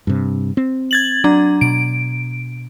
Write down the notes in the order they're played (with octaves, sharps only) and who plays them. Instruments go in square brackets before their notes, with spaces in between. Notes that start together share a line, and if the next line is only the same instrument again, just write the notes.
[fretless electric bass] G2 C3
C4
[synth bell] G#6 A6 F#7
F#3 D4 A#5
[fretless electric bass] B2 [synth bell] D7